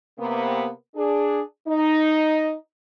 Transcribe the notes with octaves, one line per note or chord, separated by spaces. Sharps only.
C3 A#3 B3
D4 G#4
D#4